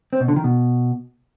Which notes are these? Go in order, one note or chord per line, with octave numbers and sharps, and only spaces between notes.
C4
B2
D3
D#3
B2